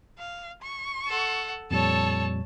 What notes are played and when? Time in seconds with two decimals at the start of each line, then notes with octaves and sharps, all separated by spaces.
0.19 F5
0.62 C#6
1.07 A4 F#5
1.71 F2 A#2 G3 A4 C#5 A5